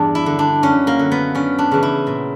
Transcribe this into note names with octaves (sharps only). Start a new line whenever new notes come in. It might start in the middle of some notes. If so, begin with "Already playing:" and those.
Already playing: E2 G2 D4
E4
D3
D4
F#2 C#4
A#3
D3
B3
F#2 C#4
D4
C#3 E3
E4
A#2